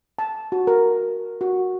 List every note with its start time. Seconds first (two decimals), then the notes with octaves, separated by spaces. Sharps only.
0.19 A5
0.52 F#4
0.67 A#4
1.41 F#4